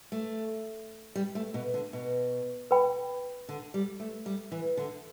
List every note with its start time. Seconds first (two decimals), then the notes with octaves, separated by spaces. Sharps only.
0.12 A3
1.16 G3
1.35 A3
1.54 B2
1.74 D3
1.93 B2
2.71 B4 G5 B5
3.49 D3
3.74 G3
4.00 A3
4.26 G3
4.52 E3
4.77 D3